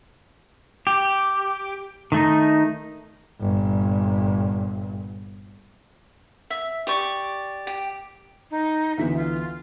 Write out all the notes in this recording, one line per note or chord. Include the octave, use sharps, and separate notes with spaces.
G4
D#3 A3 D#4
G1 A#2
E5
G4 D5 C#6
G4
D#4
D2 E3 B3 E5
F4